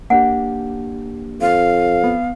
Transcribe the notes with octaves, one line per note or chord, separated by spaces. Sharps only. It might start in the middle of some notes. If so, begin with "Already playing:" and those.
A#3 D4 G4 F#5
F2 F5
B3